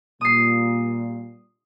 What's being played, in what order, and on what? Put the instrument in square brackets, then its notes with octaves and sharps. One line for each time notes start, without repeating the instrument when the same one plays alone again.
[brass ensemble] A#2 G3 [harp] D#6 C7